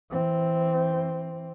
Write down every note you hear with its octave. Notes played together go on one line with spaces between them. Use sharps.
E3 C4